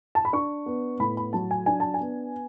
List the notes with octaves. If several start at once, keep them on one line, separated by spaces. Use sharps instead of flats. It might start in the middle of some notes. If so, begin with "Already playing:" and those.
A5
B5
D4 C#6
B3
A2 B5
B5
F#3 A5
G#5
D4 G#5
A5
G#5
B3